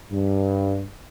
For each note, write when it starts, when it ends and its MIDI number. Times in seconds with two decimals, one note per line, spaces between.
0.12 0.83 43